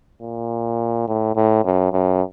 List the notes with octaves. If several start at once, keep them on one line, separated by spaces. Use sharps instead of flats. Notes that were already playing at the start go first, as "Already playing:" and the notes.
A#2
A2
A2
F#2
F#2